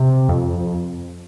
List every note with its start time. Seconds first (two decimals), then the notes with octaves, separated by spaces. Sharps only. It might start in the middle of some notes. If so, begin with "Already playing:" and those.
Already playing: C3
0.29 F2